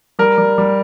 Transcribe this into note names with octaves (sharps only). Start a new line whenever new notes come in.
G3 A#4
G3
G3